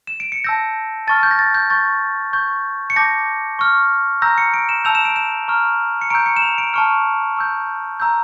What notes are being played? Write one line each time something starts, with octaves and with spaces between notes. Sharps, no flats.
E7
D7
C#7
A5 E6 G6 A#6
A5 C#6 F6 A6
G6
A#6
A6
G6
C#6 G6 A6
C#6 G6
C#7
A5 D6 G6 A#6
C#6 F6
A#5 E6 G6 A#6
C#7
D7
E7
A5 E6 G6 F7
E7
D7
E7
A#5 C#6 F6
C#7
A#5 C#6 E6 G6 D7
C#7
E7
F7
D7
A5 C#6 F6 C#7
C#6 E6 G6
A#5 E6 G6